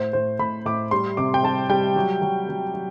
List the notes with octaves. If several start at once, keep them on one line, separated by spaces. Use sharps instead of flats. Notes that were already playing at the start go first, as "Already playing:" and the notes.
Already playing: A2 C5
A2 C5
A2 B5
A2 D6
G3 C6
C3 D6
G5
G3 A5
G3 G5
F#3
F#3
F#3
F#3